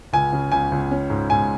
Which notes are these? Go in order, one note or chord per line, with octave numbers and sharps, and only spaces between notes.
C#2 G#5
C#3
C#2 G#5
C#2
C#4
G#2
G#2 G#5